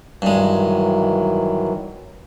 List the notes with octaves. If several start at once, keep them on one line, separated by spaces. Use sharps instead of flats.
G2 D#3 E3 F#3 G#3